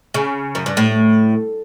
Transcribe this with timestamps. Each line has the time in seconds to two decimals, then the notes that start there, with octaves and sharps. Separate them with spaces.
0.14 C#3
0.55 F#2
0.66 G2
0.77 A2